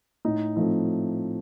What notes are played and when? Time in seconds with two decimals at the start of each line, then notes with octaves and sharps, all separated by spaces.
0.25 A2 D#4
0.56 F3 A3 C4 D#4